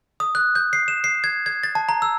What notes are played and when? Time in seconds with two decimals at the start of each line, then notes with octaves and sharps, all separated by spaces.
0.20 D#6
0.35 F#6
0.55 G6
0.73 C7
0.88 E7
1.04 C7
1.24 G#6
1.46 G#6
1.63 A6
1.75 A5
1.89 A#5
2.02 E6